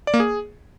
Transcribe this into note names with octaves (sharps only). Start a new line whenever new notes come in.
D5
A#3
G#4